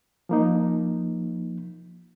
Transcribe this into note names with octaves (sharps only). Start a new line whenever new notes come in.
F3 A#3 D#4